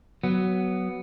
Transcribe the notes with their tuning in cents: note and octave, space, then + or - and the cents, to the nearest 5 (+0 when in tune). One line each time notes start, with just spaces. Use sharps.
F#3 +15 B3 +0